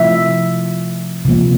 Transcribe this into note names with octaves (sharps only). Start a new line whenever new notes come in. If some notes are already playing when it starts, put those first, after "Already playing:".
Already playing: C3 F3 A3 E5
C3 F3 A#3